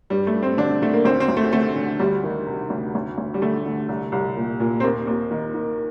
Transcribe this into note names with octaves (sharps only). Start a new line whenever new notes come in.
G2 G3
A3
G2
C4
D3 D4
D3 A3
A#3
D2 C4
C4
D2
A3
D3 A3
D3
D2 G3
D#3
C3
D2
D2
D2
G3
D3 A3
D3
C2
C2
A#2
A#2
C4
D#2 A#3
D#2
D#3
D#3